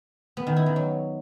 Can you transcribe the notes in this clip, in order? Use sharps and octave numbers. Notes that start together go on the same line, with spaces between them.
B3
D#3
E4
D#3
F#3